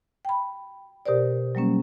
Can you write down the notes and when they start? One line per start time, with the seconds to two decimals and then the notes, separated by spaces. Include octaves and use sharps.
0.25 G5 B5
1.06 B2 G4 A#4 C5 D5
1.55 F#3 G3 A#3 C#4